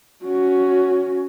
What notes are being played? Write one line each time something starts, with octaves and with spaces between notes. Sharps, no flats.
C#4 F#4